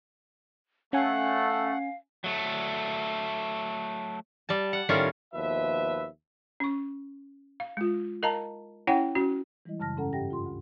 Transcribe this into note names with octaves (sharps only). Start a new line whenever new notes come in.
A3 C#4 F5 F#5 G#5
F#3 A3
G3 A5
F#5
A2 D#3 G3 C#4 F4 C#5
D#2 B2 F3 B4 E5
C#4 C#6
F5
G#3 F4
A#4 D#5 F5 A5 A#5
C#4 E4 C#5 F#5 G5
C#4 F#4
E3 G3 G#3 E4 D#5
F#2 C#3 A5 F6 A#6
G#2 C#4 A4 F#5 A#5
G2 G4 D#5 F#5 G5 A#6
F4 C6
D2 G2